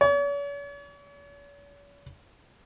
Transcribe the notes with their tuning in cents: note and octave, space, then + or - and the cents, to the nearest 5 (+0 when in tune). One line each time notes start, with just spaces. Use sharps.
C#5 +45